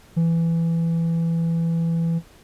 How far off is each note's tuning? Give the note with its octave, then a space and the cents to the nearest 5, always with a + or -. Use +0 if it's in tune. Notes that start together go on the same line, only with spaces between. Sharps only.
E3 +15